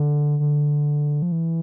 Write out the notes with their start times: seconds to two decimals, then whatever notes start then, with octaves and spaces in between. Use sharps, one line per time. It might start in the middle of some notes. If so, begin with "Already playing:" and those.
Already playing: D3
0.40 D3
1.22 F3
1.32 E3